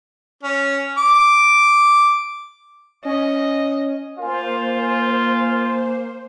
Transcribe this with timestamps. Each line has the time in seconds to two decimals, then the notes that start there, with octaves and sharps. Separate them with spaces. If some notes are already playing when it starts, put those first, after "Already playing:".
0.43 C#4
0.98 D6
3.05 C#4 D#5
4.19 A#3 F4 A#4 C5 G#5